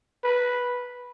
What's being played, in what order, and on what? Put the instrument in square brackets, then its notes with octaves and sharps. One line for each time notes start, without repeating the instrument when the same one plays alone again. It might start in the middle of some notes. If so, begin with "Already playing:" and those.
[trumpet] B4